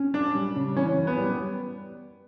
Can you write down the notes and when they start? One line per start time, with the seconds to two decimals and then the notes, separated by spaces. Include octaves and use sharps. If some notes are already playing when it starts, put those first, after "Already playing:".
Already playing: C#4
0.14 F#2 D4
0.35 G3
0.56 C#3
0.76 E3 C#4
0.97 F#2
1.07 B3
1.17 G3